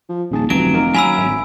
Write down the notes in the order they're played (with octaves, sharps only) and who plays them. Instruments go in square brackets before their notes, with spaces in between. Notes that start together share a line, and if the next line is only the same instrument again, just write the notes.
[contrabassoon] F3
[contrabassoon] D#1 [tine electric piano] A#1 G#4 A5
[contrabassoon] F1 [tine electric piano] D2 E3 [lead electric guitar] F#3 [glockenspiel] D7
[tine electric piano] D#3 A#3 A#4
[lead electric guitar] F#3 C#4 [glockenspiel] G#5 B5 E6
[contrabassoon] D1 [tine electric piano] G#1 E5